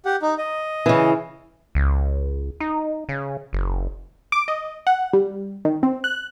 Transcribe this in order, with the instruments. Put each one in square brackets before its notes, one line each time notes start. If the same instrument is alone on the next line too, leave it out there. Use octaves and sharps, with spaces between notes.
[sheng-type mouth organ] G4 F#5
D#4
D#5
[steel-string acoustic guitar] C#3 E3
[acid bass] C#2
D#4
C#3
F#1
[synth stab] D6
D#5
F#5
G3
D#3
C4
F#6